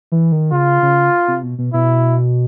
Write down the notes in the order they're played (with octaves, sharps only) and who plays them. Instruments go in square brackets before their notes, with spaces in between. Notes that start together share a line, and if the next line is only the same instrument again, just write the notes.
[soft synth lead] E3
D#3
[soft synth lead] C#3 [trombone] F4
[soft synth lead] C#3
C3
B2
B2
[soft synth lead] B2 [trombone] E4